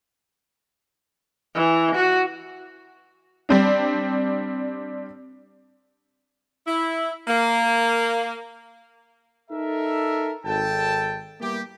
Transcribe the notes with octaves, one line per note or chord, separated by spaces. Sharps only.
E3
F#4
G3 C4 D4
E4
A#3
D#4 A4 A#4 E5
G#1 A4 G5 A5
G3 A#3 B3 E4 G4